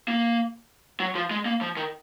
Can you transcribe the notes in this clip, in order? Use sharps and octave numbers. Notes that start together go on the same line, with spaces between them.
A#3
F#3
F3
G#3
A#3
F3
D#3